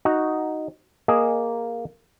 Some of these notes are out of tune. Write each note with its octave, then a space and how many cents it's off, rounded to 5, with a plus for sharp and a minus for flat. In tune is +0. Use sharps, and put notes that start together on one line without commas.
D#4 +0 F#4 +0
A#3 +0 G#4 -5 D#5 +0